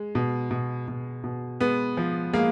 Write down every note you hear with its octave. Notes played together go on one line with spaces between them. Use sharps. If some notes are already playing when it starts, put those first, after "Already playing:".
Already playing: G#3
B2
B2
B2
B2
G#3 B3
F3
G#3 A#3